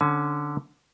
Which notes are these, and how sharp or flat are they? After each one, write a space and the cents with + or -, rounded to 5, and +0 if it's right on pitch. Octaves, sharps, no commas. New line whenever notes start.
D3 +0 C#4 +0 G#5 +40